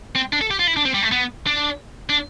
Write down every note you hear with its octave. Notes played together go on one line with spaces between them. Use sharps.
C4
D4
A4
G4
F4
E4
D4
C4
G3
A3
B3
D4
D4